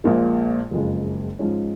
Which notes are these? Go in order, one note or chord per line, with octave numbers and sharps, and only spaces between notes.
A#1 A#2 G#3
F#1 F2 C#3 G#3
G#2 F3 G#3 C#4